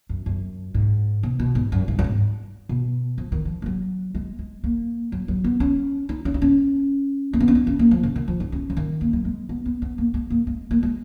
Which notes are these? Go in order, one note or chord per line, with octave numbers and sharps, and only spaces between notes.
F#2
F#2
G#2
B2
B2
G#2
F#2
G#2
F#2
G#2
B2
F3
D#3
F3
G#3
F#3
G#3
G#3
A#3
F#3
F#3
B3
C#4
D#4
C#4
D#4
C#4
A#3
B3
C#4
D#4
C#4
A#3
F3
C#3
D#3
F3
D#4
C#4
F3
D#3
A#3
F#3
G#3
B3
B3
B3
A#3
G#3
A#3
G#3
A#3
G#3